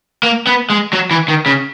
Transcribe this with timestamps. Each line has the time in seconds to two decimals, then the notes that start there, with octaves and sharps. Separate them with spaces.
0.23 A#3
0.47 B3
0.70 G#3
0.93 F#3
1.11 E3
1.28 D#3
1.46 C#3